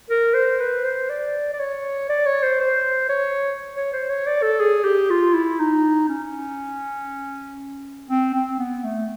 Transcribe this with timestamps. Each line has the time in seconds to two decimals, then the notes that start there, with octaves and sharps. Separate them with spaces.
0.11 A#4
0.34 C5
0.60 B4
0.85 C5
1.10 D5
1.53 D5
1.60 C#5
2.09 D5
2.27 C#5
2.43 C5
2.61 C5
3.10 C#5
3.77 C#5
3.93 C5
4.10 C#5
4.27 D5
4.43 A4
4.60 G#4
4.85 G4
5.10 F4
5.34 E4
5.60 D#4
6.09 C#4
8.10 C4
8.35 C4
8.59 B3
8.84 A3